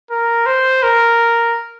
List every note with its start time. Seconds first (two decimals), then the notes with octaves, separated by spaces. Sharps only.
0.11 A#4
0.46 C5
0.83 A#4